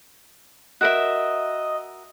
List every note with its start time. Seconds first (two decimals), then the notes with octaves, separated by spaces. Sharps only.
0.81 F#4 A#4 D#5 E5